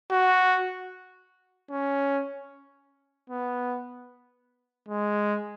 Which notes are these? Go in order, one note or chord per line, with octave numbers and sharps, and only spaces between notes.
F#4
C#4
B3
G#3